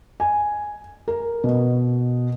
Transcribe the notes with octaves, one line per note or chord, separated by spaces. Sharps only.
G#5
A#4
B2